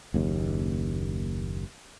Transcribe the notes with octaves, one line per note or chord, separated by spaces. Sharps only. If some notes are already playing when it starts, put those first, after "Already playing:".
F#1 D#2